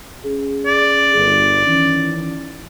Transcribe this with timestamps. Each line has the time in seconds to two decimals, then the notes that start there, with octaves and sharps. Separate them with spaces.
0.25 C#4 G#4
0.66 D5
1.15 G1
1.66 D#3 E3 C#4